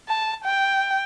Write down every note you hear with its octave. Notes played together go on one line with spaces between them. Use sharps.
A5
G5